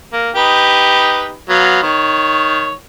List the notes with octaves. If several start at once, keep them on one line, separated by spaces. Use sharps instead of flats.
A#3
D#4 G4 B4
F#3 B3 F5
D#3 C#5